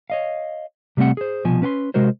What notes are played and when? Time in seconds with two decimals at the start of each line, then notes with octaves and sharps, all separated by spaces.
0.10 C#5 D#5 F5
0.97 C3 G3 A3 C4 F#5
1.17 G#4 C5
1.44 C2 B2 F3 G#5
1.62 C#4 B4 G5 C6
1.94 C3 G#3 F#4 A#4 C5